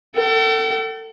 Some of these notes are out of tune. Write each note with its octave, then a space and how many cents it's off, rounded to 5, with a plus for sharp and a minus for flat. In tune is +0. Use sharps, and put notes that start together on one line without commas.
A4 +30 G5 -45